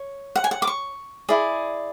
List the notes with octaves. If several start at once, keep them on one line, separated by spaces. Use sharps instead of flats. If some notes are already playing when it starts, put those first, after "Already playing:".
Already playing: C#5
F#5
G#5
F#5
D6
C#6
E4 G#4 D5